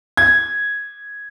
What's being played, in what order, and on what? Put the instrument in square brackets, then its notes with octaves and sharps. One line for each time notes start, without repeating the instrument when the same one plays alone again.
[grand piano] G#6